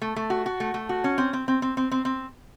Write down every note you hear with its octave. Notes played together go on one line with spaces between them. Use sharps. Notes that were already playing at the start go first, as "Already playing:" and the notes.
A3
A3
F#4
F#4
A3
A3
F#4
C#4
C4
C4
C4
C4
C4
C4
C4